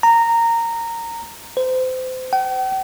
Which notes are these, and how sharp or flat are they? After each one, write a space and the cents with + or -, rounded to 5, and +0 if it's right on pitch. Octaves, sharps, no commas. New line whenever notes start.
A#5 -15
C5 -30
G5 -45